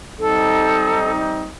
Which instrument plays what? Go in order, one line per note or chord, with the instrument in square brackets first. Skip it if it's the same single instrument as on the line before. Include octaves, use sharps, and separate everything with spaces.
[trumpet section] G3 C4 D#4 [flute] A4